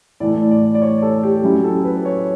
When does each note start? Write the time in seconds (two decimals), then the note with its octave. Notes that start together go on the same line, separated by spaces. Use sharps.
0.20 A2 E3 A3 D5
0.51 D5
0.75 D5
0.82 C#5
1.02 A4
1.23 G4
1.43 F#3 C#4 E4 G4
1.64 A4
1.84 B4
2.05 C#5